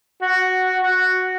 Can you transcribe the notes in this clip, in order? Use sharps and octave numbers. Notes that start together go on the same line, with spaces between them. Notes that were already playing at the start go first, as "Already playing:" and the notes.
F#4
F#4